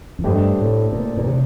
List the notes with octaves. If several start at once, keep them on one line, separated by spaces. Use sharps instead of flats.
F2
G2 A3 D4 G4 C5 D#5
A2
A#2
A#2
C3